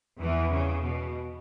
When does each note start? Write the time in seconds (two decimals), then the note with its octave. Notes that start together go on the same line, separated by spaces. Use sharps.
0.19 E2 E3
0.50 C#3
0.82 B2